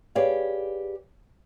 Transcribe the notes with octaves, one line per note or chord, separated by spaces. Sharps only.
G4 G#4 B4 C#5 D5 F5